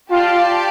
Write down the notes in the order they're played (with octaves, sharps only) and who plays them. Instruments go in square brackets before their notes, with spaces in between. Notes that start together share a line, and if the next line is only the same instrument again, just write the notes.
[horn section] F4 [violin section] G4 D5 A5